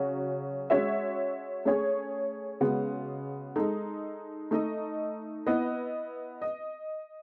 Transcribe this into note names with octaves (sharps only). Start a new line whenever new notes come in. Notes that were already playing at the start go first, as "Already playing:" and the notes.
Already playing: C#3 F#3 C#4 F#4
G#3 C#4 F#4 C#5 E5
A3 C#4 G#4 C#5
C#3 G#3 B3 F#4
G#3 D#4 A4
A3 D#4 A4 D#5
B3 E4 B4 D#5
D#5